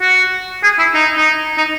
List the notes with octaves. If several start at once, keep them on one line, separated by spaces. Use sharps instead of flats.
F#4
G#4
E4
D#4
D#4
D#4